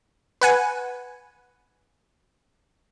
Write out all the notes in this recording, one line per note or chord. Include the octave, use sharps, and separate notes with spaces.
B4 F#5 G#5